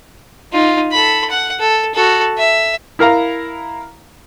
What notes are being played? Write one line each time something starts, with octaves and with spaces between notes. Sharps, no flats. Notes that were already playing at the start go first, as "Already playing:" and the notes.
D#4 F4
A4 B5
F#5
A4
F#4 A4
E5
E4 A#4 F5 A#5